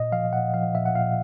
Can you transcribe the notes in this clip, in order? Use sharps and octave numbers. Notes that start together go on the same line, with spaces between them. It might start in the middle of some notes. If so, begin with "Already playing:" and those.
Already playing: A#2 D#5
F3 F5
A#2 F#5
F3 F5
A#2 E5
F#5
A#2 F5